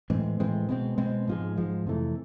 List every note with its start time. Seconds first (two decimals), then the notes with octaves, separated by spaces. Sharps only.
0.10 A2 E3 G#3 C4
0.40 A2 E3 G#3 C4
0.69 B2 G#3 C4
0.98 B2 G#3 C4
1.27 G#2 F3 G#3
1.56 G#2 F3 G#3
1.86 F2 C3 E3 A3